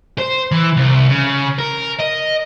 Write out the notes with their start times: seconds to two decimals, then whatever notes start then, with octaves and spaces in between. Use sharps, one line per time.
0.18 C5
0.52 E3
0.77 C2
1.09 C#3
1.58 A#4
1.99 D#5